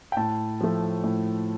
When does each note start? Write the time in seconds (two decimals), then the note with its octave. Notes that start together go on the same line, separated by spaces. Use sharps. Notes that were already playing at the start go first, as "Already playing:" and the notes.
0.12 G5
0.17 A2 A5
0.61 F3 A3
1.04 A2